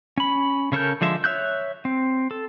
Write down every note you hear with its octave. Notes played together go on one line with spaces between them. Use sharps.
C#4 B5
C#3 C#4 A4 A#4 G6
D3 F3 G#3 E5
C#5 E5 E6 F#6 G6
C4
A4